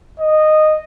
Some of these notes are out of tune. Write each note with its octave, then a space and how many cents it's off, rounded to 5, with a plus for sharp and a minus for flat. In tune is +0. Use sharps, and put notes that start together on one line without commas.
D#5 -10